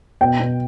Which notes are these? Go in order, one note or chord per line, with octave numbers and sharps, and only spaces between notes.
B2 G5
B2